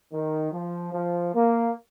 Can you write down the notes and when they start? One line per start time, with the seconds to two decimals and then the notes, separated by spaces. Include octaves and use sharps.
0.12 D#3
0.52 F3
0.93 F3
1.34 A#3